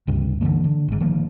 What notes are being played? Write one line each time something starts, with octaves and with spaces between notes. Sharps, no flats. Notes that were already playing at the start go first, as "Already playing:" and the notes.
C#2 G2 C3
D3 E3 F#3 A#3
D3
G#1 G#2
D#3 F3 A#3